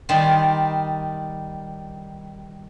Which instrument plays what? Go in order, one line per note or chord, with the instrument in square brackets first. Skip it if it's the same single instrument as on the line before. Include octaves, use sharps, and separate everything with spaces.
[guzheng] D#3 G3 A5 C6